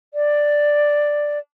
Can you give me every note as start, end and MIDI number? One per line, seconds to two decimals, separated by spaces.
0.14 1.39 74